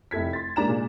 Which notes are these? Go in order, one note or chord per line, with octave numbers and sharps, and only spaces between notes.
F1 E4 A4 G#6 B6
C6 A6
G#2 A#3 D4 A#5 E7
A#2 G#3 D4